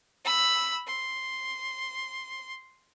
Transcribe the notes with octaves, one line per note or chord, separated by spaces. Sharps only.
B5 E6
C6